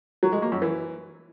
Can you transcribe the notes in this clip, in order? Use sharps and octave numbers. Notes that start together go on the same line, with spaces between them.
F#3
G#3
A#3
F#2
E3